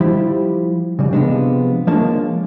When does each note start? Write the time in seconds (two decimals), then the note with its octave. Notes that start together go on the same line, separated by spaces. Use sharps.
0.01 F3 G3 E4 G4
0.99 C#3 G3
1.13 C3 F3 G#3 B3 D4
1.87 F3 G#3 A#3 D4 C#5 A5